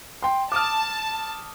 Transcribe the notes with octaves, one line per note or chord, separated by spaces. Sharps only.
G5 C6
A5 D6 D#6 F6